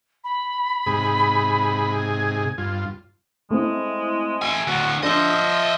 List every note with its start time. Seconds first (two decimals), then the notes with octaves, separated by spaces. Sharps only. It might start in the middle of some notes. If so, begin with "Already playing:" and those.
0.24 B5
0.87 G#2 C3 G#4
1.97 G#6
2.58 G2 F4
3.51 G#3 A3 C4 E4
4.42 A3 G#5 E6 D7
4.67 D2 A2 F#4
5.03 F3 D4 D#5 E5
5.30 D#6